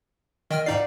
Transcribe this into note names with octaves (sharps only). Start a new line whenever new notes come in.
D#3 D#5 G5 F6
G#2 D#4 D5 F5 F#5 C7